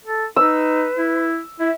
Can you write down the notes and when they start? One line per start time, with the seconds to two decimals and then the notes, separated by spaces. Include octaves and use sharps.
0.05 A4
0.36 D#4 B4 E6
0.98 E4
1.60 E4 E5